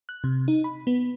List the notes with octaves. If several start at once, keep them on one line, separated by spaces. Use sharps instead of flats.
F#6
C3
D#4
B5
B3